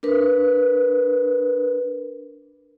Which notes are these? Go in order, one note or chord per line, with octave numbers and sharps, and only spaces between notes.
D4 A#4 B4